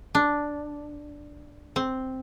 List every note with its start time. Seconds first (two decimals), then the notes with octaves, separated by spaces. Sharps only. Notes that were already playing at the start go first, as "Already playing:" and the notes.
0.15 D4
1.76 C4